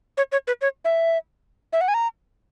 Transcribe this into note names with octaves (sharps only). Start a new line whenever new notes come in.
C#5
C#5
B4
C#5
E5
E5
F#5
G#5
A#5